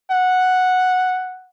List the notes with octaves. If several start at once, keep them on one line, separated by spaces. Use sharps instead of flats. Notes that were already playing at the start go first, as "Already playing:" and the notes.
F#5